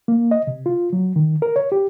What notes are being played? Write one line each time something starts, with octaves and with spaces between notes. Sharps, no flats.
A#3
D#5
C3
F4
F#3
D#3
A#4
C#5
G4